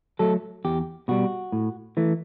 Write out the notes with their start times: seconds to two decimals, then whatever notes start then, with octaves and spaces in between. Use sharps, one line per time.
0.19 F#3 A3 A4
0.65 E2 G4
1.08 B2 G3 F#4
1.52 A2
1.97 E3 A3